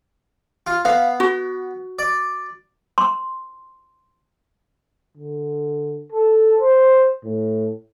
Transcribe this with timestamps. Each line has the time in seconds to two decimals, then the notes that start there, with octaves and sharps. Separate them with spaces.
0.66 F4
0.85 B3 F5
1.20 F#4
1.99 D5
2.98 C6
5.17 D3
6.12 A4
6.60 C5
7.25 A2